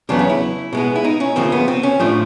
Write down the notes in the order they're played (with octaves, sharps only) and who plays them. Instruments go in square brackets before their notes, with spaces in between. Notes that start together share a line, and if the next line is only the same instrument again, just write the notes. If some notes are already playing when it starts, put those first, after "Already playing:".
[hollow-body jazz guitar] E2 C#3 F#3 B3 D4
C#4
E4
B2 G#3 B3
E4
D#4
C#4
D2 C#3 F3 A#3 C4
B3
C4
C#4
A2 F3 A3 D4